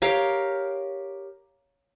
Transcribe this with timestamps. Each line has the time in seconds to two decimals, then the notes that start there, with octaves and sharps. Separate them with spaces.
0.02 G4 A#4 C#5 F5